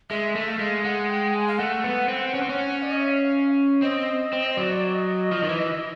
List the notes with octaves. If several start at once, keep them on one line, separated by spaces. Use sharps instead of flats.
G#3 E5
A3
F5
G#3
G#3 F#5
G5
G#5
F5
A3 F#5
B3
C4
C#4
C4
C#4
D5
D#5
E5
F5
C4 D#5
C4
F#3 D5
D#5
F3
D#3
E3